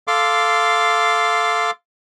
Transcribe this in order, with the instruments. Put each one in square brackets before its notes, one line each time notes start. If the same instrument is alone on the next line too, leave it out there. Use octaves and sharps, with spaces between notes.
[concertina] A4 F5 C6 D6